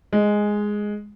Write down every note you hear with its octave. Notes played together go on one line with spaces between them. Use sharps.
G#3